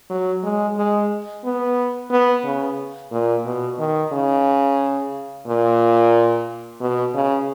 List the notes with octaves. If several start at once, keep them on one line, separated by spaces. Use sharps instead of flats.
F#3
G#3
G#3
B3
B3
C#3
A#2
B2
D#3
C#3
A#2
B2
C#3